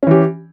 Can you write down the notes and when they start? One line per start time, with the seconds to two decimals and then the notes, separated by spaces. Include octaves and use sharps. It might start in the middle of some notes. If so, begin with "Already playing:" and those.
0.03 C#4
0.07 E3
0.11 G4